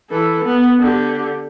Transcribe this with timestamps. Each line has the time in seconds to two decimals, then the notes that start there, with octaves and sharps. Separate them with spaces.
0.10 E3 A4
0.45 B3
0.80 D3 G4